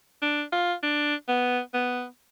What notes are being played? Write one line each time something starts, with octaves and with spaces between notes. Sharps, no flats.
D4
F4
D4
B3
B3